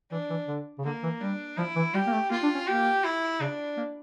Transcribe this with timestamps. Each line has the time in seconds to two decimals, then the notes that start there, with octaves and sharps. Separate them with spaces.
0.11 E3 D4
0.30 E3
0.48 D3
0.78 C#3
0.84 D3 A#3
1.03 E3
1.21 G3 D4
1.58 F3 E4
1.76 E3
1.94 G3 G4
2.07 A#3
2.13 A3
2.31 A#3 F4
2.43 D4
2.55 C#4
2.67 A#3 G4
3.04 E4
3.40 C#3 D4
3.77 A#3